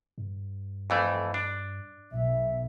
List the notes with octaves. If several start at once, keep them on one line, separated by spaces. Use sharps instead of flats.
G2
F2 E3 A3
D4
B1 E5